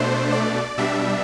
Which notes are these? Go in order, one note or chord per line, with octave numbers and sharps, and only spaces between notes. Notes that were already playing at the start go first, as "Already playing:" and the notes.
Already playing: B2 A3 D4 C5
D5
B2 G3 D4 E5